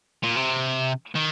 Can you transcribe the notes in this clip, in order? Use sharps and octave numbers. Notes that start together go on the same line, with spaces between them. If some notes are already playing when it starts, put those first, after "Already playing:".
A#2
C3
D#3